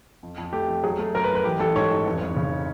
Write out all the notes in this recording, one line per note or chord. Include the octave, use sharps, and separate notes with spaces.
F2
F2
A3 G4
F2
F#3 G#4
A3
F#2 A#4
B4
F#2
B4
A1 G4
A1 A4
G#2 C#5
A1
F1
F1
C#3